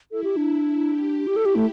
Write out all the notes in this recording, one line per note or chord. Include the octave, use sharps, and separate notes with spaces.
E4 A4
G4
D4
G4
E4 G4
A4
G4
A3